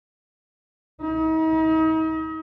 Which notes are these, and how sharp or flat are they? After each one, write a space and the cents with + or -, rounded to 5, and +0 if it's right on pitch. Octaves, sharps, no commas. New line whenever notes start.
D#4 +40